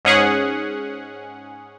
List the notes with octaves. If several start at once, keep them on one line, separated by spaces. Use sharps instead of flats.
G#2 C#4 G#4 F#5